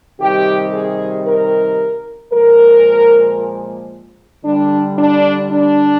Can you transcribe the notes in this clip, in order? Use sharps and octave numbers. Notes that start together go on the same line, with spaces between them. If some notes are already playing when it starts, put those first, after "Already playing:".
C3 D#3 G3 G4
G#4
A#4
A#2 F3 G#3 A#4
D3 G3 D4
D4
D4